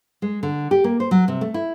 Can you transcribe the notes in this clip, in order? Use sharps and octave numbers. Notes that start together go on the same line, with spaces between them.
G#3
D3
G4
A#3
C5
F#3
C3
A3
E4